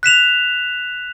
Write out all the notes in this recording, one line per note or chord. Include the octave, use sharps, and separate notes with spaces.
F#6 B6 E7 F7